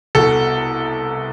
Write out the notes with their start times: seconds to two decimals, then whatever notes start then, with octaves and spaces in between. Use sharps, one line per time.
0.15 C2 B2 A4